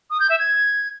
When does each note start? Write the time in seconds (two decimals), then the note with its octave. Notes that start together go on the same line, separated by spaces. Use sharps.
0.10 D#6
0.20 G6
0.30 E5
0.39 G#6